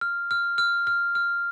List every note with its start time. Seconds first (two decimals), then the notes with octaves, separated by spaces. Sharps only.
0.01 F6
0.31 F6
0.58 F6
0.87 F6
1.15 F6